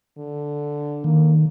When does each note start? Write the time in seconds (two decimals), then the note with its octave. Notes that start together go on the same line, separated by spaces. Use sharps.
0.17 D3
1.04 D#3 A#3